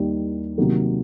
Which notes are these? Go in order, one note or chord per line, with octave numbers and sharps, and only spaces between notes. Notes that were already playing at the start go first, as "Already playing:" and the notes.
Already playing: D#2 D#3 G3
C3 D#3 F#3 A#3